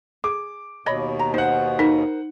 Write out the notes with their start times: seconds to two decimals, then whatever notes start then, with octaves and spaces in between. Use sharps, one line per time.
0.24 G#4 D6
0.86 D#2 B2 C#5 D#5 B5
1.19 A#5
1.34 D#4 C5 F#5
1.79 D#4 A#4